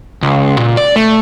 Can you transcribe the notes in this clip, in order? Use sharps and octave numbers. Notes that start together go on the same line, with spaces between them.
C#2
A#2
D5
A3